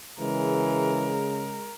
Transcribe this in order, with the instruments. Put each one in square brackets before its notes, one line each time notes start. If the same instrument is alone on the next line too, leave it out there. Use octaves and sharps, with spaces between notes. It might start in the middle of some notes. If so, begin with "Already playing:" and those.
[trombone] C#3 [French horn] E3 [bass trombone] G#3 [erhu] A#4